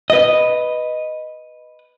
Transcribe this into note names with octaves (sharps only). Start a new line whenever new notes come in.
B4 D#5